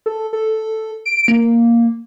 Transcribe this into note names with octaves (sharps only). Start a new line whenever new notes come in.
A4
A4
D7
A#3